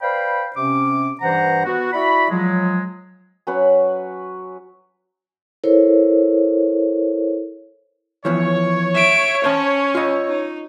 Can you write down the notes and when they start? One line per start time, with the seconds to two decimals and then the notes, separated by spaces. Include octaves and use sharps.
0.01 B4 C5 D5 F5 G5 B5
0.56 C3 C#4 D6
1.21 G2 E3 C5 F#5 A#5
1.65 B3 F#4
1.93 E4 F#4 D5 B5
2.30 F3 F#3 G#3
3.47 F#3 C#4 B4 F#5
5.64 E4 A4 A#4 C5 C#5
8.25 E3 F3 B3 C#5
8.94 E5 D7
9.44 C#4 C5 A5
9.95 F4 D#5
10.28 D#4